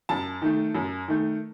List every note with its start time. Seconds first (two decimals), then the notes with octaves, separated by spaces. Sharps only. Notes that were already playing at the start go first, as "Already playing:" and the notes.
0.09 F#2 A5
0.42 D#3 A3
0.75 F#2
1.08 D#3 A3